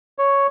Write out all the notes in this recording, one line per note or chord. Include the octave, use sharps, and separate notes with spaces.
C#5